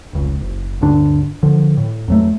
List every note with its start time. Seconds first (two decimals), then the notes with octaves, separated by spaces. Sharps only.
0.13 F1 C#2
0.41 F#1
0.81 D1 G2 D3 D4
1.43 D3 F3
1.77 A2
2.08 F2 F#3 A3